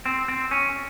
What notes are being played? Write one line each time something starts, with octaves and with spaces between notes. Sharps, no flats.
C4
C4
C#4